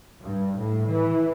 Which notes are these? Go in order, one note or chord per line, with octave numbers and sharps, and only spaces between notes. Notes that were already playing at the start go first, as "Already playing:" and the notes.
G2
A2
E3